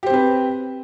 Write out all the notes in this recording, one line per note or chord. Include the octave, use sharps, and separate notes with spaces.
C4 G4 B4 C5